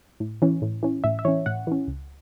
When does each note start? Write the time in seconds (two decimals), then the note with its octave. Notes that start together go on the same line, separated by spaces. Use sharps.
0.20 A2
0.42 E3 C#4
0.62 A2
0.83 E3 C#4
1.04 A2 E5
1.19 E5
1.25 E3 C#4 C#5
1.46 A2 F#5
1.67 E3 C#4
1.87 C#2